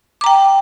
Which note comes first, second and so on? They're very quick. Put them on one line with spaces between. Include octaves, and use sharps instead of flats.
D6 A#5 G5